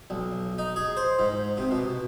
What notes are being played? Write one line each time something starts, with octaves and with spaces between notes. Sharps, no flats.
B1
D#4
G#4
C5
G#2
C3
B2